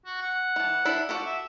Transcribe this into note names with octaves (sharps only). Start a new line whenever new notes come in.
F#4
F#5
E3 A5
D4 E4 E5
F#4 G4 A4
E5